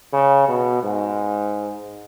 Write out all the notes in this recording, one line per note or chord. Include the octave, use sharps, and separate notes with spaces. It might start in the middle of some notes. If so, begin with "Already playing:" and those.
C#3
B2
G#2